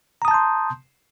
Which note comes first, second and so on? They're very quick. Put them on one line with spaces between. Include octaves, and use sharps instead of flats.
A#5 D#6 A5 G6 C6